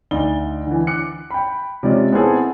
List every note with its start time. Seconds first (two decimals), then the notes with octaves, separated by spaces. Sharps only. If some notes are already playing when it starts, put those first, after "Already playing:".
0.11 D2 D#4 D5 G7
0.67 D3 E3
0.87 D6 F#6 C#7
1.30 G5 B5
1.83 C3 G#3 C#4 F4 D5 D#5
2.12 B3 C4 E4 G#4 A4